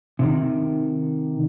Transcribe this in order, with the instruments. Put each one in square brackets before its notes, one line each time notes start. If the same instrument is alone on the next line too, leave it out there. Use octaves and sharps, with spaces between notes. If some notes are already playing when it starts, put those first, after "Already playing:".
[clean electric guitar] C3 D#3